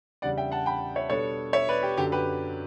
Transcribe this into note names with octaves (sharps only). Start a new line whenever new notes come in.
E2 C#3 G3 D4 D5 F#5
E5 G5
F#5 A5
G5 B5
C#5 E5
B2 G3 B3 D4 A4 C#5
C#5 E5
B4 D5
G4
F#2 D3 F#3 G4
G4 B4